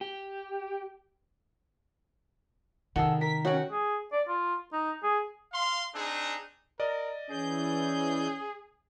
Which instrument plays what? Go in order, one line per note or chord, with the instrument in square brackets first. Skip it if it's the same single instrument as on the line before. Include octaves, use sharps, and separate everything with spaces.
[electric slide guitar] G4
[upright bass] C3 [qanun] D#3 [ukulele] G#4 A4 F#5
[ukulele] A#4 [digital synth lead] B6
[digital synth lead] C#4 [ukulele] D#4 G5 [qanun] F#4 F#5
[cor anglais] G#4
D5
F4
D#4
G#4
[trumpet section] F5 C6
C4 D4 D#4 G#4
[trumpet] A#4 [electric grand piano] D5 D#5
[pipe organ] E3 G6 [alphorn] C#4 [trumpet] G#4